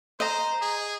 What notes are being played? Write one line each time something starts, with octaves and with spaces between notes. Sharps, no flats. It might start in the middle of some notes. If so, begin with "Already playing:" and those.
C5 D#5 A#5
G#4